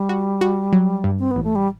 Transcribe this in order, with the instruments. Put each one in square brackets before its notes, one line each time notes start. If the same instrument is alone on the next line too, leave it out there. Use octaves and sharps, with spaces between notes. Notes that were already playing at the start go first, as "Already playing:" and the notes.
Already playing: [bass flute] G3
[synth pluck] F#4
F#4
F#3
G2
[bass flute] C4
B3
[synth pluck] A1
[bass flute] A3
G3